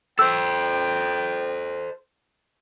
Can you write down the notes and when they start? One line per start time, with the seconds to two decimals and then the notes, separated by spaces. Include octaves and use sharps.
0.19 A4 C5 G5 E6